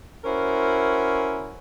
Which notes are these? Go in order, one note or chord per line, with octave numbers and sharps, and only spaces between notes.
C#4 E4 F#4 A#4 C5